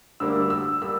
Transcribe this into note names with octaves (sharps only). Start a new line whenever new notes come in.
D2 D3 G3 A#3 E6
E6
G3 A#3 E6